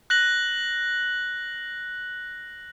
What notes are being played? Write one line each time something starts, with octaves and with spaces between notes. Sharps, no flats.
F#6 A#6 F#7